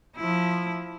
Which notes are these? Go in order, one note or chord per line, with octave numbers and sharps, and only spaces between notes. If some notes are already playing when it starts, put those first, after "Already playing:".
F3 E4